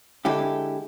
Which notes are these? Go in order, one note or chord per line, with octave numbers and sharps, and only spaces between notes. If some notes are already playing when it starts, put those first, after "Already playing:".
D3 G#3 E4 G4